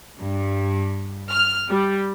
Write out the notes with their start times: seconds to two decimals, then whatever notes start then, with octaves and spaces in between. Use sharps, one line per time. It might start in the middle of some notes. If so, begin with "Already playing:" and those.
0.18 G2
1.31 F6
1.69 G3